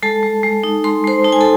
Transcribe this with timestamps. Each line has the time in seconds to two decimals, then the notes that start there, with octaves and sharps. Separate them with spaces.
0.03 G#3 A4 A5
0.23 G#3
0.43 G#3
0.64 D#4
0.84 G#3 C6
1.04 G#3 C5 C6
1.24 D#4 A5
1.32 G#5
1.41 A4 A5